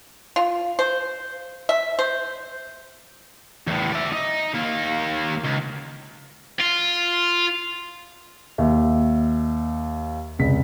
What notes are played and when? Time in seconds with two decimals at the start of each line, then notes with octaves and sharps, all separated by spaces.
0.36 F4
0.79 C5
1.69 E5
1.99 C5
3.67 E2 A2
3.93 D5 E5
4.13 D#4
4.54 D#2 A#3
5.44 C#2
6.60 F4
8.58 D#2 E5
10.39 F1 C#2 B6